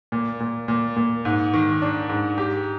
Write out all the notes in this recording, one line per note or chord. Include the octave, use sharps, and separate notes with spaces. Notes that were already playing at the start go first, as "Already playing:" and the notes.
A#2
A#2
A#2
A#2
G#2
D#3
D4
G#2
G4